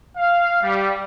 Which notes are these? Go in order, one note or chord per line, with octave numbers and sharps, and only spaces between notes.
F5
G3